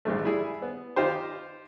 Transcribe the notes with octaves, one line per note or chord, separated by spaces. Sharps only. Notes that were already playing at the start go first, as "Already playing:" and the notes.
A1 G2 G#3 A3
G3 E4 G#4
B3
D#4 F4 G4 C5